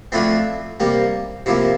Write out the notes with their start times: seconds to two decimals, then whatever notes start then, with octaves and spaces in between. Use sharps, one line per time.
0.12 D3 F3 A3 C4 E4
0.80 C3 G3 A#3
1.46 C3 F3 A#3 E4